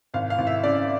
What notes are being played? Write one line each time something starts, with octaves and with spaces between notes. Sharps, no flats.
G#1 F5
F5
G#1
E5
C#3 D5